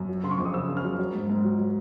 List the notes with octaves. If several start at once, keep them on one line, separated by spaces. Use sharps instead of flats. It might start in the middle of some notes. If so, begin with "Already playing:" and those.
Already playing: F#2
F#3
C#3 C6
C#6
F2 D6
D#6
C#3 E6
C#3
F6
F#3
F#3
G#2
G#2
F#3
F#3